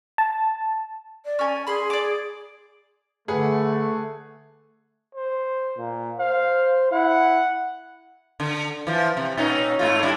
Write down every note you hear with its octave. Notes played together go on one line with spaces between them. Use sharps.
A5
D5
C#4 G#5
G#4 B5 C6
D5 D6
D3 A3 G#4 B4 F#5
C5
A#2
C5 F5
E4 F#5
D3
E3 F3
C3
A#2 C#4 D#4
G#2 A3 F4
G3 D4 E4